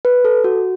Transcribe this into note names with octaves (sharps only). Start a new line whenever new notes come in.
B4
A4
F#4